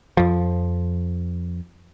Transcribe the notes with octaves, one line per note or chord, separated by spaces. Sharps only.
F2 F3